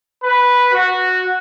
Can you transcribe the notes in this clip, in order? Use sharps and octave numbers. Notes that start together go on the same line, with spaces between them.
B4
F#4